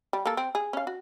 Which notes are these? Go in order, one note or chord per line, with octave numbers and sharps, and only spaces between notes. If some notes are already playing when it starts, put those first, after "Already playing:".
G3
A#3 A4
C4
G#4
C#4 F5
F#4